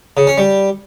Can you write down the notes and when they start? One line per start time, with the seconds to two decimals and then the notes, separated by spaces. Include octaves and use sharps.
0.17 C#3
0.27 C#4
0.38 G3